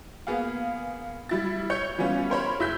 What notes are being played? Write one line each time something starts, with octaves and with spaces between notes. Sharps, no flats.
A#3 B3 G#4 F5
G3 E4 A6
C#5 C#6 G6 C#7
E3 G3 B3 C#4 F4
A#4 C5 C#5 B5
F#1 E4 E6 G6 B6